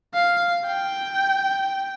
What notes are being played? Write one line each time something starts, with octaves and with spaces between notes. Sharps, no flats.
F5
G5